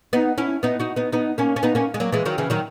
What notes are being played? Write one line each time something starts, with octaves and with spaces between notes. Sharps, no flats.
B3 D#4
C#4 E4
B3 D#4
D#4 F#4
B3 D#4
B3 D#4
A#3 C#4
C#4
B3 D#4
A#3 C#4
G#3
F#3 A#3
E3 G#3
D#3 F#3
C#3 E3
D#3 F#3